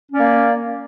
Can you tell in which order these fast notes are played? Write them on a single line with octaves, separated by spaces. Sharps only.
C#4 D5 A#3